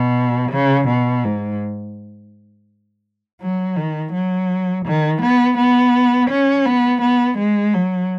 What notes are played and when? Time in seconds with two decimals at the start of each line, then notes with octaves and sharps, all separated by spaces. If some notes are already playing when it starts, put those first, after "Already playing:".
Already playing: B2
0.52 C#3
0.88 B2
1.24 G#2
3.41 F#3
3.77 D#3
4.13 F#3
4.85 D#3
5.22 B3
5.58 B3
6.30 C#4
6.66 B3
7.02 B3
7.39 G#3
7.74 F#3